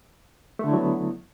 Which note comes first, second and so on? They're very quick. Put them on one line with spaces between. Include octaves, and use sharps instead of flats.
A3 D3 E4 F#3 B3